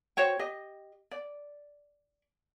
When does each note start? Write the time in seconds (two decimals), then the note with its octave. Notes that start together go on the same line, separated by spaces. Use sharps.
0.17 F#4 C5 C#5 G5
0.39 G4 D#5
1.11 D5